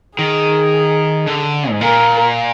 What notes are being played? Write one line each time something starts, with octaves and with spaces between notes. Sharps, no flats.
D#3 G#4
D3
G#2
A#2 A#4